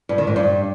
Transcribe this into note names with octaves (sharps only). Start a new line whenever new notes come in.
G2
D#3
G#2
G2